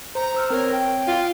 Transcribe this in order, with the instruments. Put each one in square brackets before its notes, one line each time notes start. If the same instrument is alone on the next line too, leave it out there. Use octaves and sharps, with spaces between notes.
[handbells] C5 [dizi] A#5
[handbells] C5 E6 F6
[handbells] C4 C#5 [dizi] A#4
[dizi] G5
[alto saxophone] F4